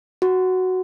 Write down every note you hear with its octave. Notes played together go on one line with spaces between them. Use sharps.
F#4